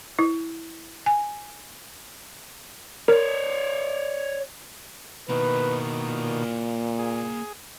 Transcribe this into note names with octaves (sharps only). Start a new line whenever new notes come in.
E4
G#5
A#4 C#5 D5
B2 D#3 A#3 E4 B4
A#2
G#4